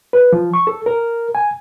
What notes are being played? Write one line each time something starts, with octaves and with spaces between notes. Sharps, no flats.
B4
F3
C#6
A4
A#4
G#5